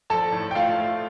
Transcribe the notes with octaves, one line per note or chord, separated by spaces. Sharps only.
A#1 A4 A5
A2
G5
A3 F4 F5
A3